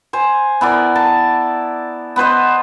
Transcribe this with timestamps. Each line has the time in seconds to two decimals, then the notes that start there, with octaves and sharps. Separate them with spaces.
0.13 C5 G#5
0.61 B3 E4 A#4 D5
0.96 A5
2.16 B3 B4 C5 D#5